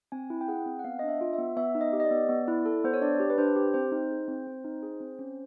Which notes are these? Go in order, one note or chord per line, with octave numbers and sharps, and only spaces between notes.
C4 G#5
E4
G5
G#4 F#5
C4
F#5
B3 F5
D4 D#5
E5
F4
E5
B3
B3 E5
D#4
D#5
G4
D#5
D5
B3
B3
E4
A4
B3 C5
C#5
D4 D5
G4
B4
D4 C5
G4
C4 C5
D#4
G#4
C4
C4
D#4
G#4
C4
C#4